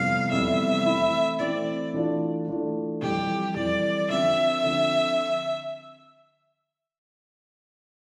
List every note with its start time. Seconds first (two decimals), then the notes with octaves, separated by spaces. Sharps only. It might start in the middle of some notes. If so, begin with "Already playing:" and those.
Already playing: F2 C3 E3 G3 B3 F5
0.31 F2 C3 E3 G3 B3 E5
0.86 E3 A3 C4 E4
1.40 E3 A3 C4 E4 D5
1.94 E3 A3 D4 F4
2.48 E3 A3 D4 F4
3.02 F2 E3 G3 G4
3.56 F2 E3 G3 D5
4.10 D3 F3 C4 E5
4.63 D3 F3 C4